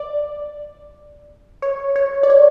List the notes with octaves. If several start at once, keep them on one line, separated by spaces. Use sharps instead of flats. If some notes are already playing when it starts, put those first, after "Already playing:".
Already playing: D5
C#5
C#5
D5
C#5